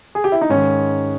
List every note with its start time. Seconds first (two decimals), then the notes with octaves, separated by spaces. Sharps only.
0.15 G#4
0.24 G4
0.32 E4
0.41 D#4
0.49 G#2 D#3 G#3 C#4